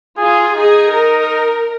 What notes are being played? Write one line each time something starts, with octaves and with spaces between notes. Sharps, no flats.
F4 G#4
D#4 G#4
A#4